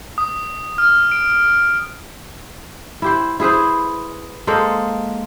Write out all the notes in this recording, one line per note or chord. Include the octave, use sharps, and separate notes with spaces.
D#6
F6
D7
E4 G4 C5
E4 G#4 B4 C5
G#3 A#3 A4 C5